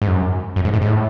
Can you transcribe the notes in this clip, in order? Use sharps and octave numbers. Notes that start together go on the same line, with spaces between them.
G#2
F#2
F#2
G#2
A2
G#2
A2